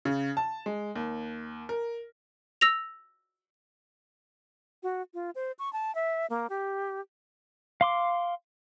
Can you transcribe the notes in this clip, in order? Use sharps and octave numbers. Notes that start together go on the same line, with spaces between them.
C#3
A5
G#3
D#2
A#4
E6 A#6 F7
F#4
F4
C5
C#6
A5
E5
A#3
G4
F5 C6 D6